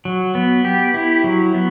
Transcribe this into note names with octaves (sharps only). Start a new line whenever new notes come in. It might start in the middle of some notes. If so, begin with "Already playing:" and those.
F#3
B3
G4
E4
F#3
B3